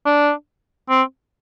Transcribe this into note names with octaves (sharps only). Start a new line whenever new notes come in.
D4
C4